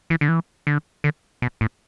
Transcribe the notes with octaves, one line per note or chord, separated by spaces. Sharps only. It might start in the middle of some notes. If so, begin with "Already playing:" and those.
E3
D3
E3
D3
D3
B2
A2